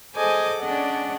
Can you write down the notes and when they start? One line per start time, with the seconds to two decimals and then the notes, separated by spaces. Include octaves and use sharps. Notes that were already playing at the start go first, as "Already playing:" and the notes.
0.15 G#4 A4 C5 D#5 G#5 D6
0.61 C#4 D4 G#4 D5 D#5 F#5